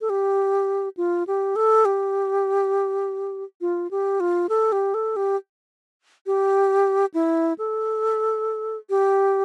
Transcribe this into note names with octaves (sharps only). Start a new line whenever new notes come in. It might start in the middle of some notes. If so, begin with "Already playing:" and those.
A4
G4
F4
G4
A4
G4
F4
G4
F4
A4
G4
A4
G4
G4
E4
A4
G4